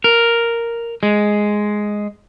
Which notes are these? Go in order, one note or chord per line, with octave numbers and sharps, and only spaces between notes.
A#4
G#3